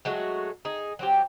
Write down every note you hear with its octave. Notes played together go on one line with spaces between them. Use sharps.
F#3 G#3 A3 F#4
D#4 G#4
F#3 C4 G4